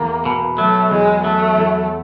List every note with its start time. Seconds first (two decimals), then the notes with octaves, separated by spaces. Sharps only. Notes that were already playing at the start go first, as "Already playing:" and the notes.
Already playing: E2 A#3
0.25 B2
0.58 F#3 A3
0.91 E2 G#3
1.24 F#3 A3
1.57 E2